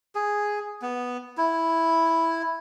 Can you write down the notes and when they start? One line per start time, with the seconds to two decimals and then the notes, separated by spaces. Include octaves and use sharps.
0.15 G#4
0.82 B3
1.38 E4